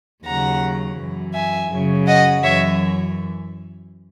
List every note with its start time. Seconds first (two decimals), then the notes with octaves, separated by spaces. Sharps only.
0.25 D#2 C#3 F#3 F#5 A#5
0.98 F#2 E3
1.34 E5 G#5
1.71 F#2 C#3 F#3
2.07 D#5 F#5
2.43 F#2 E3 C#5 E5